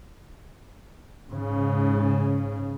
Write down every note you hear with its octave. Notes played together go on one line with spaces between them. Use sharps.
G#2 C#3